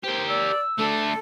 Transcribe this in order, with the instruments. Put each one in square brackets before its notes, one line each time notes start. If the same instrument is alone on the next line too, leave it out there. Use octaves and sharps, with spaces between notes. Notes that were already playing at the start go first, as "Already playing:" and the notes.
[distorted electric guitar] G4 A#4 [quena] C5
[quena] D5 [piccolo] E6
[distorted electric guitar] D3 A3 [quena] A4